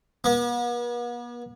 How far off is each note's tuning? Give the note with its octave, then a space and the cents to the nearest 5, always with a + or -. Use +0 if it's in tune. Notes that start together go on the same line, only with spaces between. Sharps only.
B3 -45